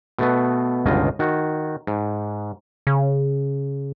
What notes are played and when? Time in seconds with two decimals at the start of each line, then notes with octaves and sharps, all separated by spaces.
0.18 B2 A3 B3
0.86 G1 C#2 B2 F4 D#5
1.19 D#3 F#4
1.87 G#2
2.87 C#3